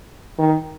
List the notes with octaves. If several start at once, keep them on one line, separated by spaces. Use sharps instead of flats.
D#3